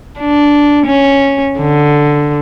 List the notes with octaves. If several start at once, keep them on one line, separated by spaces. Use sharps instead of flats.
D4
C#4
D3